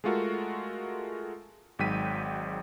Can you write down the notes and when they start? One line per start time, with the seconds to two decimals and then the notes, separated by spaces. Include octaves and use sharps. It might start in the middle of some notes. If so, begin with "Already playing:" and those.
0.04 G#3 A3 F4 F#4 A4 A#4
1.79 G#1 G#2 F#3 G5 B6 D#7